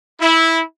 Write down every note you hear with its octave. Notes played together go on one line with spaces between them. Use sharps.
E4